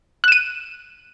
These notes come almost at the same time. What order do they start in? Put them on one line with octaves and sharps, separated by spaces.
F#6 E7 D#7